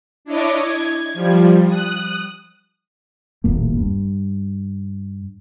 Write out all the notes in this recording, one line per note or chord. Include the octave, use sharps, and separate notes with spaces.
D4 E4 C#5 D#5 D6
G#6
F3 G3
D#6 F#6
D#1 A#1 A2 A#3
G2